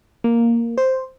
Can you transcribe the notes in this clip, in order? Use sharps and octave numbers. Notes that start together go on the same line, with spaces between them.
A#3
C5